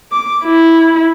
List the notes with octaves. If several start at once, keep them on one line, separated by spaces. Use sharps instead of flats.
D6
E4